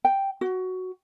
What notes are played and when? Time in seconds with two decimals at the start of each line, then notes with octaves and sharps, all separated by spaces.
0.05 G5
0.41 F#4